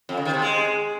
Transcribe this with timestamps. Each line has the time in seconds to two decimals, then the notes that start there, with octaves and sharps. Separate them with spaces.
0.09 F2
0.17 C#3
0.25 D#3
0.34 C3
0.42 G#3